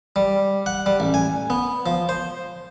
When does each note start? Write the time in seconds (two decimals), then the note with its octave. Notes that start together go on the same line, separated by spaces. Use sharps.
0.16 G3
0.66 F#5
0.86 G3
1.00 A1
1.14 G#5
1.50 B3
1.86 F3
2.09 C5